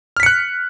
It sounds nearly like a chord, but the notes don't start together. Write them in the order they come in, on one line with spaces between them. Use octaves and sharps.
F6 B6 C#7 F#6